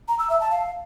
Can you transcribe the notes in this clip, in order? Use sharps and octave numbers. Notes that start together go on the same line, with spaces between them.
A#5
E6
E5
A5
F5